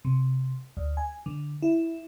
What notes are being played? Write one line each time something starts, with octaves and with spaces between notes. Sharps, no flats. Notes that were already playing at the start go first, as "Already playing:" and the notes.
C3
D2
G#5
D3
E4